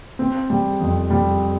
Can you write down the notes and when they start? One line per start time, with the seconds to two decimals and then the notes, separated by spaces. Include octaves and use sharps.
0.19 C4
0.50 G3
0.80 F2
1.10 G3